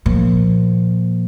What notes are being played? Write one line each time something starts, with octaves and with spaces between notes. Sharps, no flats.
A#2 F3